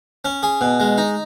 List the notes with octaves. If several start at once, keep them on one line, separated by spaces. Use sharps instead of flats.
C#4
G#4
B2
G#3
D#4